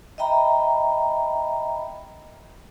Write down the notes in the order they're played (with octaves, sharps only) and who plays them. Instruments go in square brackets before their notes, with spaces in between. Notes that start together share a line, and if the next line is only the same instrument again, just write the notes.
[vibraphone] D#5 E5 G5 A#5 B5